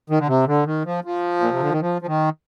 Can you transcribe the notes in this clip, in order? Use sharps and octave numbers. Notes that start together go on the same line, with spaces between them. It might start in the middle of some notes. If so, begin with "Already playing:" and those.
D#3
D3
C3
D3
D#3
F3
F3
A#2
C3
D3
D#3
F3
F3
D#3